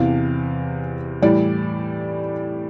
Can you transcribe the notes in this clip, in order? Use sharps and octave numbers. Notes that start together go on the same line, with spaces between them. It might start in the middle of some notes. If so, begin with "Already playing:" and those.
Already playing: E2 C3 E3 F5
A2 E3 G3 D5